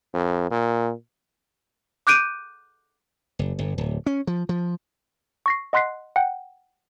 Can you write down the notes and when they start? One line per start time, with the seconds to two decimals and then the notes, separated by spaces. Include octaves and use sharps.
0.14 F2
0.51 A#2
2.07 D6 F#6 G6 D7 D#7
3.39 F#1
3.59 G1
3.78 D1
4.06 C#4
4.27 F3
4.49 F3
5.46 C#6 A#6 C7
5.73 D#5 F#5 C6 F#6 B6 C7
6.16 F#5 G5